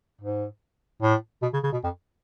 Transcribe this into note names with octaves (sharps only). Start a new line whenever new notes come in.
G#2
A2
B2
C#3
C#3
B2
F2